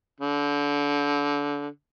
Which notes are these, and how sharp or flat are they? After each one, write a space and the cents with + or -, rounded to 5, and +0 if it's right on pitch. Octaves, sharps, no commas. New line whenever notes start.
D3 -25